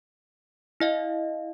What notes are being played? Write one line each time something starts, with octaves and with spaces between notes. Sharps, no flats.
E4 D#5 F5